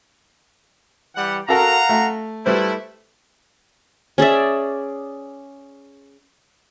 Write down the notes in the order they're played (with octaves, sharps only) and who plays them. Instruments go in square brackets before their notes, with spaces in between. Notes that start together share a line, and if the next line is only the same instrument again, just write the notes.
[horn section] E3 G3 F#5
[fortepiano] F#4 A4 A#4 [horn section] F5 F#5 A#5
[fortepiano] A3
[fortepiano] G3 B4 C5 [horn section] A3 E4
[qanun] C#4 G#4 D5 E5